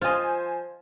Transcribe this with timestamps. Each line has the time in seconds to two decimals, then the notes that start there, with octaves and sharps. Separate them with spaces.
0.01 F3 F4 C5 D#5 G#5